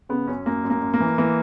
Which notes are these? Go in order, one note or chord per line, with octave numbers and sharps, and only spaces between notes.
C#3 B3
F#2 C#4
F#2 A#3
F#2
A#3
F#2
A#3
E3
E3 A#3